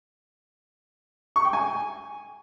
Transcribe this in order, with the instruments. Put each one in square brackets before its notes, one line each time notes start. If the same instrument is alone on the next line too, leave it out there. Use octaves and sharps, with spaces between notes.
[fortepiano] C#6
G5
G#5